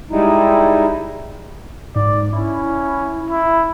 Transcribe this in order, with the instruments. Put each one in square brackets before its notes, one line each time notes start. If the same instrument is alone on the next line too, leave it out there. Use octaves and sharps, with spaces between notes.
[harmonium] G3 G#3 D#4 E4
[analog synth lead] G#2 [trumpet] D5
[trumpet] C#4 [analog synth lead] E4
[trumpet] E4